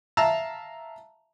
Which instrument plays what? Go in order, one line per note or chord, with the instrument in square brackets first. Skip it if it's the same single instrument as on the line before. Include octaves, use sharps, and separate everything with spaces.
[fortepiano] E5 F5 A5 A#5 E6